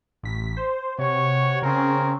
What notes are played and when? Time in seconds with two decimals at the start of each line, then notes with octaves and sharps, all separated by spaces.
0.23 A1 B6
0.57 C5
0.98 C3 F#4 C#5
1.62 C#3 C4 C#4 G#4 A#4